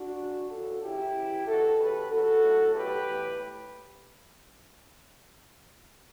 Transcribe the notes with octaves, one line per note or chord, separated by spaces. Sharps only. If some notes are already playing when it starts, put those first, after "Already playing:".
Already playing: D4 F#4
C#3 F#3
C#3 E3 F#4 A4
C#3 F#3 E4 G4
C#3 E3
B2 F#3 F#4 A4
C#3 E3 G4 B4
C#3 F#3 F#4 A4
A2 F#3
B2 F#3 G4 B4
A2 E3